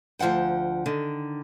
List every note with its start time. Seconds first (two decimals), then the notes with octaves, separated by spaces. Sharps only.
0.19 D2 F3 G#3 F#5 G5
0.86 D3 D#3